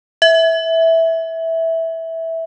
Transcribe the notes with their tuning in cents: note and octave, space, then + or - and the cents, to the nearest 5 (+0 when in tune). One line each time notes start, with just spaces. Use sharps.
E5 -10